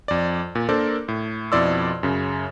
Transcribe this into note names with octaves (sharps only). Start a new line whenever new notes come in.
F2 D5
A#2
A#3 D4 A4 A#4 C5 D5
A2
F2 B2 E4 D5 C6 E6
F#2 C#3